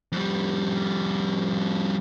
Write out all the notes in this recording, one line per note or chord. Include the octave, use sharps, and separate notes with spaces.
F2 G3